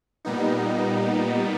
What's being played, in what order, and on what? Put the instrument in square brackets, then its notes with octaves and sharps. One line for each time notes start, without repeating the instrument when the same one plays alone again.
[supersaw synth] A#2 G3 B3 D#4